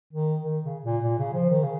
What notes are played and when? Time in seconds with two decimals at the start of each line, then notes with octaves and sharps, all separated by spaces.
0.13 D#3
0.43 D#3
0.64 C#3
0.83 A#2
1.03 A#2
1.18 C#3
1.34 F3
1.49 D#3
1.63 C#3